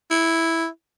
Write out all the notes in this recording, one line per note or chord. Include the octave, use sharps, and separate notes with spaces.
E4